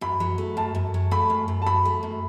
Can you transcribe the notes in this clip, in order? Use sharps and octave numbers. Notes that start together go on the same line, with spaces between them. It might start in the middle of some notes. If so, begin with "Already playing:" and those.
F#2 B5
F#3
A3
F#2 A5
F#2
F#3
A3 B5
F#2
F#2
A5
F#3 B5
A3
F#2